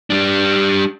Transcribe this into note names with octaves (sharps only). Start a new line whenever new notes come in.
G3 D4